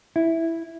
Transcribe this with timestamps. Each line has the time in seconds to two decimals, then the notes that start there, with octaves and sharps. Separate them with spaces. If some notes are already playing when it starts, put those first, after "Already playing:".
0.16 E4